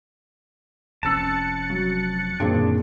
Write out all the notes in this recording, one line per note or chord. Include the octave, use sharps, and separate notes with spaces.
F1 F2 C#4 A5 E6 F#6 A6 C#7
F#3
F#2 A#2 D3 D#3 C4 D4 G#4